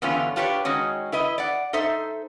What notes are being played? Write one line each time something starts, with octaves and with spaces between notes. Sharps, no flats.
E2 G2 D3 B3 C#4 F4
D4 F4 G4 B4 C#5
D#3 G#3 C#4 F#4
E4 B4 D#5
D5 F#5
D#4 A4 C5 E5